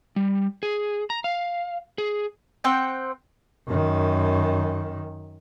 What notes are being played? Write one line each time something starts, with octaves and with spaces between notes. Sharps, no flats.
G3
G#4
A#5
F5
G#4
C4 F#5 G5
F#2 D#3